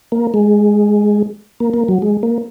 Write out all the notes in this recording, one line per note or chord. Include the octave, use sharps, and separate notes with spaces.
A#3
G#3
A#3
A#3
F#3
G#3
A#3